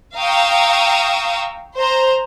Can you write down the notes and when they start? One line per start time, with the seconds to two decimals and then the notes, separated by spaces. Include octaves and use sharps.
0.17 F5 G5 A#5 C#6 D#6 E6
1.77 C5 A#5